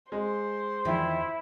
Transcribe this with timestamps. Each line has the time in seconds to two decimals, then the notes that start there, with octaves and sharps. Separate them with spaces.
0.12 G#3 C5
0.85 E2 D#3 F3 E4